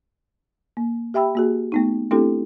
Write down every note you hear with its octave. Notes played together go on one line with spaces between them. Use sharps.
A#3
G4 E5 G5 B5 E6
A#3 F#4 G#4
A3 B3 D#4
A3 C4 D4 E4 G4 A4